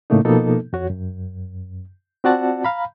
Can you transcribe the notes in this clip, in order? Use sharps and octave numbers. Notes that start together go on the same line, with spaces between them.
A2 C#3 A3 A#3 D#4
B2 F3 A#3 B3 D#4 A4
F2 F#4 C#5
F#2
C4 F4 F#4 D5 F#5 A5
F5 A#5 B5